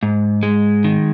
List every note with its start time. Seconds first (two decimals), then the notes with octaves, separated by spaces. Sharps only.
0.03 G#2
0.43 G#3
0.84 D#3